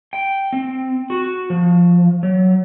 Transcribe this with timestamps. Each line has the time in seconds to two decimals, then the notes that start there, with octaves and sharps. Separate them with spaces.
0.13 G5
0.53 C4
1.10 F#4
1.50 F3
2.23 F#3